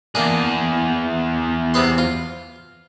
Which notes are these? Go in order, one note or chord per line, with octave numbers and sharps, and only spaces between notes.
E2 A#3 D4 G#4
C3 B3 C6
F4